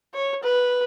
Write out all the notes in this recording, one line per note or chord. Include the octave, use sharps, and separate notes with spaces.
C#5
B4